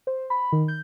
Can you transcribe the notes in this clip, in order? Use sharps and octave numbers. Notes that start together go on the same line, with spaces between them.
C5
B5
D#3
G6